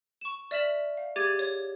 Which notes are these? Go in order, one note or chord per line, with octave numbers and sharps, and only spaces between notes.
C#6 E7
D5 E5 F6 B6 E7 F#7
F5
G4 G#4 D6 G#6 A6 D#7
C#5